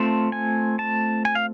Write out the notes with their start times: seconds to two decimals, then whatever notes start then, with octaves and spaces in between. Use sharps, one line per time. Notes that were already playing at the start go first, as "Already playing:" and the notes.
Already playing: A3 C4 F4 A5
0.32 G#5
0.79 A5
1.25 G#5
1.35 F5